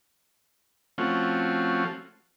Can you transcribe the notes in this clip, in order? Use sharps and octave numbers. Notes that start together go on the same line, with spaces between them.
F3 A3 C4 C#4 F4 F#4